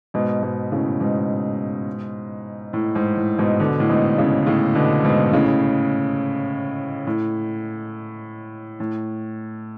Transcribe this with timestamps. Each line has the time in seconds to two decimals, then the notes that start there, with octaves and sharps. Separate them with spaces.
0.14 G#2 B2
0.42 G#2 B2
0.72 A2 C#3
1.00 G#2 B2
2.73 A2
2.95 G#2
3.17 A2
3.39 G#2 B2
3.59 B2 D3
3.80 A2
3.89 G#2 B2
4.18 A2 C#3
4.46 A2 C#3
4.75 B2 D3
5.04 G#2 B2
5.33 A2 C#3
7.07 A2
8.80 A2